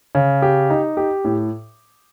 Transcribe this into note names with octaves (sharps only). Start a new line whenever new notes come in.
C#3
G4
D#4
G4
A2